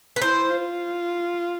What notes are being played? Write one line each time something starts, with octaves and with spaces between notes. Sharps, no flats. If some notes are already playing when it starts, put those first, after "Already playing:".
B4
E4 C5
F4